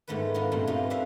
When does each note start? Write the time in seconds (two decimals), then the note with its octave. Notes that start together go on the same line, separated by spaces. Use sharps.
0.08 G#2 D#3 A3 B3 B4
0.34 B3 C4 D4 D#4 F4 A#4
0.52 G2 A#2 G#3 A3 C4
0.67 A3 A#3 D#4 F4 G4
0.90 C4 D4 B4 E5 F5